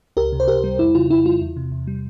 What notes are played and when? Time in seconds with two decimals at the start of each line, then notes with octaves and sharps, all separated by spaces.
0.17 C#2 G4 A#4
0.33 C3
0.40 C5
0.48 C#2 G4 A#4
0.64 G3
0.79 F2 E4
0.95 C#3 F4
1.10 F2 E4
1.25 G3 F4
1.41 E2
1.57 C3
1.72 E2
1.87 G3